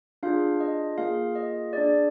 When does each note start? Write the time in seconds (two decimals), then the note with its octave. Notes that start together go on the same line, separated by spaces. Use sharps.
0.23 D4 F4 G#4 F5
0.60 D#5
0.97 A#3 F4 G#4 F5
1.35 D#5
1.73 D4 G#4 D5